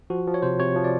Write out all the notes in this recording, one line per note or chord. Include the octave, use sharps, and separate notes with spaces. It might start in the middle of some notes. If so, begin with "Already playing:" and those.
F3 F#4
F3
C#5
C3 C5
C3 C#5
F3
D5